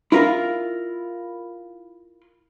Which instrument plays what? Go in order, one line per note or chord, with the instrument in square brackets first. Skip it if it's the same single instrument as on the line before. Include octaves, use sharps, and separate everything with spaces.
[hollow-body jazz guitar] E4 F4 A#4 F5